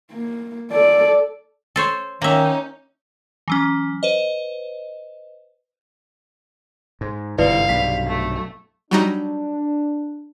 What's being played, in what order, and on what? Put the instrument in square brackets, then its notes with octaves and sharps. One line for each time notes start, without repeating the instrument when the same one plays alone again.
[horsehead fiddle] A#3
A4 D5
[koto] A4 C5 C#5
[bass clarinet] D#3 [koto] A#3 E5 [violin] C#4 D#4
[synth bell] E3 F#3 C#4
B4 C5 D#5
[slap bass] G#2
[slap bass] G1 G#2 C3 [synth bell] E4 B4 D5 [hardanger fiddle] F5
[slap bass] B1 G2 C3 [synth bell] B6
[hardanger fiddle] A3
[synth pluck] F#3 G3 D#4 [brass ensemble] D4